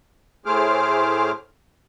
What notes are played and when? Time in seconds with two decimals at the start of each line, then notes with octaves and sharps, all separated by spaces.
0.46 A2 A3 G#4 C5 D6 F6